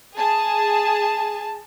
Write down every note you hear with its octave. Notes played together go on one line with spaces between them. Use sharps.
G#4 A5